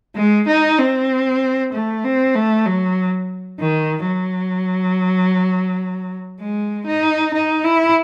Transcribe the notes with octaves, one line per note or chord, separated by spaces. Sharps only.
G#3
D#4
C4
A3
C4
A3
F#3
D#3
F#3
G#3
D#4
D#4
E4